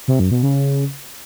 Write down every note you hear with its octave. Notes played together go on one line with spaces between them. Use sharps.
C3
F#2
B2
C#3